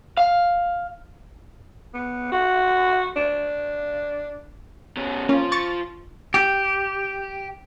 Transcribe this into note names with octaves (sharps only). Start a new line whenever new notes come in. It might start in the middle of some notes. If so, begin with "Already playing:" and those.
F5
B3
F#4
D4
B2 C#4
F3 A#3 C#4 F4
C#6 A6
G4